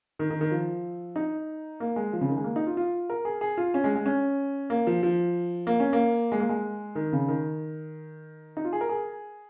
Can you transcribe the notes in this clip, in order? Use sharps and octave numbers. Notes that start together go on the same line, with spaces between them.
D#3
D#3
D#3
F3
D#4
A#3
G#3
F3
C#3
D#3
G#3
A#3
D#4
F4
F4
A#4
G#4
G#4
F4
C#4
G#3
G#3
C#4
A#3
F3
F3
A#3
C#4
A#3
G#3
A#3
G#3
D#3
C#3
D#3
D#4
F4
G#4
A#4
G#4